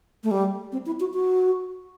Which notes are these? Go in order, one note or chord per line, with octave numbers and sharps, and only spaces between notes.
A3
G3
C4
E4
F#4
F#4